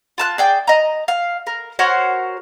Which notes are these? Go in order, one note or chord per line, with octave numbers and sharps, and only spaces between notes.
F4 A5 F#6
G#4 D5 G5
D#5 A#5
F5
A#4
F#4 A#4 C5 C#5